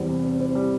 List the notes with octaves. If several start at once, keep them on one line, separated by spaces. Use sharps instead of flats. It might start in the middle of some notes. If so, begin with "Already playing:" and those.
Already playing: E2 G3 C4
C3
C4
C4
G3